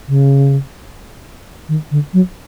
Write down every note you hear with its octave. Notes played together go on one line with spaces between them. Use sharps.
C#3
D#3
D3
F#3